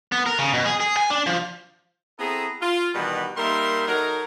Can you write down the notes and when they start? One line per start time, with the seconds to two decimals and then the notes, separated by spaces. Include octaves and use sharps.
0.12 B3
0.26 A#4
0.39 C#3
0.53 B2
0.66 G#4
0.80 G#4
0.97 G#5
1.10 D4
1.27 F3
2.19 B3 C4 E4 G#4 A4 A#5
2.62 F4
2.94 B2 D#3 E3 G3 B3
3.37 G3 A#3 D#4 A#4 E5 C6
3.87 F#3 D#4 A4 A#4